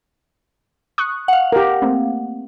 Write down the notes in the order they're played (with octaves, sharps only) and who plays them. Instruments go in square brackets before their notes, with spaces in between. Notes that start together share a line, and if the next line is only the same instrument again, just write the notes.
[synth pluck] C#6 D#6 F#6
[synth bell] F5 F#5
[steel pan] G4 A#4
[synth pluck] A3 A#3 C4